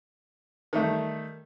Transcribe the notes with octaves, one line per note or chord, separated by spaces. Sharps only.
D#3 G3 A3